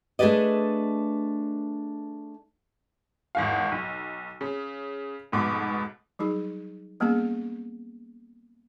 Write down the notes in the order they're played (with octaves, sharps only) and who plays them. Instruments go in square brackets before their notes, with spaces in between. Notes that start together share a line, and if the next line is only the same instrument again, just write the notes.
[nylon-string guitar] A3 D4 G#4 B4 D5 D#5
[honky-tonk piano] G#1 E2 F5
B1
C#3
F1 F2 G#2 B2 D6
[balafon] F#3 G3 D#4 G#4
G3 A#3 B3 C#4 G#4